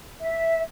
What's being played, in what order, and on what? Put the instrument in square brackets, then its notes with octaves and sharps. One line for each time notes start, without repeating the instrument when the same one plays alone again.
[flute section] E5